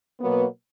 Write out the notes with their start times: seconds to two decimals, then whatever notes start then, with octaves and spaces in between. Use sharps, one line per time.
0.21 B2 F#3 A#3 B3